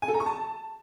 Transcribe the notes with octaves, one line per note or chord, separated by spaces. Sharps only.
G#5
A4
A#5
C#6
A5